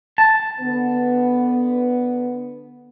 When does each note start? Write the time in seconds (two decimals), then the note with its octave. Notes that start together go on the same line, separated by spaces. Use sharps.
0.18 A5
0.61 D3 B3